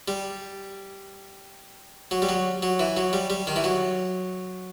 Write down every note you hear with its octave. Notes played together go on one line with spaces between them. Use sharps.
G3
F#3
G3
F#3
F#3
E3
F#3
G3
G3
D#3
E3
F#3